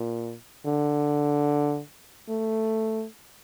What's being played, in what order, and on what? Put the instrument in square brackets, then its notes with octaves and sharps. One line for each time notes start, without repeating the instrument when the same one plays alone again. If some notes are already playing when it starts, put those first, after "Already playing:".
Already playing: [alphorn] A#2
D3
A3